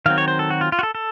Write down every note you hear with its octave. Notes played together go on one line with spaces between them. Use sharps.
D#3 F#3 C4 F5
C#5
C5
A4
F#4
F4
F4
F#4
A4
A4